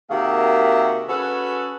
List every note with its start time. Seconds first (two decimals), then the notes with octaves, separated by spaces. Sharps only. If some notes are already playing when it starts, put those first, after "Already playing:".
0.10 C3 D#3 A#3 F#4 G#4 E5
1.09 C#4 F#4 G#4 A4 B4